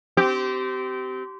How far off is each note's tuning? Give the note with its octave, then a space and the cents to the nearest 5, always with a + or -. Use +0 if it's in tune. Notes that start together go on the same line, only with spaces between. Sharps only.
C4 -25 G4 -25